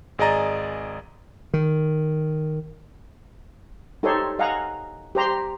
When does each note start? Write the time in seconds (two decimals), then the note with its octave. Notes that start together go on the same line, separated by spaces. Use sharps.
0.19 G#1 G#4 D5 D#5 A#5 A6
1.54 D#3
4.03 D#4 G4 A4 C5 C#5 C6
4.39 D#5 F5 F#5 G#5 A#5
5.15 G4 C5 A#5 C6